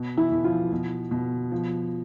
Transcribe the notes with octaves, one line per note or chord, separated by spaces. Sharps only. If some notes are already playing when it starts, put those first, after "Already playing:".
Already playing: B2
E3 E4
B2
F3 F4
B2
B2
F3